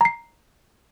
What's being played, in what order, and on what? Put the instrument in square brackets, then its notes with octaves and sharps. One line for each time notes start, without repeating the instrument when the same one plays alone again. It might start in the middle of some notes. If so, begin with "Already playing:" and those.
[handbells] A#5 C7